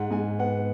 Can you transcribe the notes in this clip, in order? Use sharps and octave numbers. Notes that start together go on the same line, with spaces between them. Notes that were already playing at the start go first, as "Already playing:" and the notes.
Already playing: G#2 F#5
G#2 G#5
B3 F#5